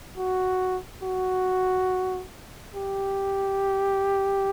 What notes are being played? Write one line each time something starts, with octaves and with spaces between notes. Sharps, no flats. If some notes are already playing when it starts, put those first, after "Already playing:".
F#4
F#4
G4